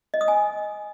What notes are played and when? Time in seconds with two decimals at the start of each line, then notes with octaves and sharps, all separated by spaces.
0.14 D#5
0.21 D#6
0.28 G#5